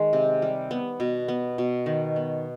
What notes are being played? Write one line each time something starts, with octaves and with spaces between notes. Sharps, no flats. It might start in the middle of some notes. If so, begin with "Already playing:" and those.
Already playing: D#3 G#3
C3
G3
B3
B2
B3
B2
D#3
B3